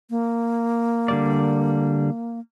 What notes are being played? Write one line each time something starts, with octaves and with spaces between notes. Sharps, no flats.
A#3
D3 G3 D5